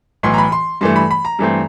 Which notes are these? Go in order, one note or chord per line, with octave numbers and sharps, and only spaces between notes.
B1 A2 E3 C6
A#5
B5
C6
G2 E3 A3 C6
B5
B5
A#5
G2 E3 A3 C4